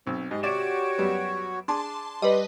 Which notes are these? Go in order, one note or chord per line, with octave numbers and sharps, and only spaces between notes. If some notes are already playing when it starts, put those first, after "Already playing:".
B1 C4
G#2 G4 D#5
C3 F#4 C#5 D5 D7 E7
F#2 G3 B3
D4 G#4 A5 C6
G3 B4 D#5 C6